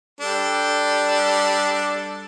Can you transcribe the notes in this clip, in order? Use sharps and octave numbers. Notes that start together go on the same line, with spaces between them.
G3 D4 A4